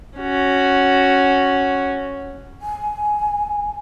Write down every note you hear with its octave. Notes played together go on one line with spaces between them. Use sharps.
C#4 F#4
G#5